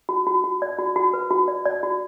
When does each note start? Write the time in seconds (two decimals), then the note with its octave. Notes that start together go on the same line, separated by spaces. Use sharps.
0.09 F#4
0.27 F#4
0.44 F#4
0.62 D5
0.79 F#4
0.96 F#4
1.14 B4
1.31 F#4
1.48 D5
1.66 D5
1.83 F#4